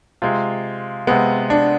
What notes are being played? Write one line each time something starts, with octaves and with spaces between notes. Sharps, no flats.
C3 G#3 F4
C3 G#3 B3
D4